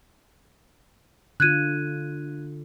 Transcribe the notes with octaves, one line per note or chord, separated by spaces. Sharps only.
D3 F4 F#6 G#6 D#7